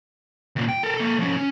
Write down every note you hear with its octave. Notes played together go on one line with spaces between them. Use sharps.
D#2 A#2
G5
A4 A#4
A#3 A4
F3 C#4
C#4